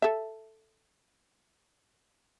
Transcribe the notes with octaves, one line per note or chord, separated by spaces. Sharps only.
A4 E5